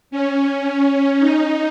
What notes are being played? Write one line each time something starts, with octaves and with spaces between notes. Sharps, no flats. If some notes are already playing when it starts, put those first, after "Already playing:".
C#4
D#4